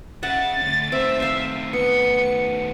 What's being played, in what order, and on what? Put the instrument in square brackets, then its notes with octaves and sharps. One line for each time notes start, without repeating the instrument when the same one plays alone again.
[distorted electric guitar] C#3 [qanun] E5 F#5 [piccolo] A6
[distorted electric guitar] D2
[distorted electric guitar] D#3 A3 [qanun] C4 [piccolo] E5
[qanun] C5 F5
[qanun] B3 [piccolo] C#7